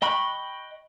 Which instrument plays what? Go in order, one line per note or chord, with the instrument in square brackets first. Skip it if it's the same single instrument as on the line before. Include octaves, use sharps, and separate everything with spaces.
[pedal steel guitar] D#5 G5 B5 C#6 F#6